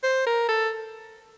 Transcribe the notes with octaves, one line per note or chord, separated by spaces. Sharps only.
C5
A#4
A4